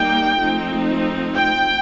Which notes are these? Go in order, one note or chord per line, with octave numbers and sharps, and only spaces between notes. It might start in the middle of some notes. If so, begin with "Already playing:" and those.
Already playing: G3 A#3 D#4 G5
F3 A3 C4 D#4
G5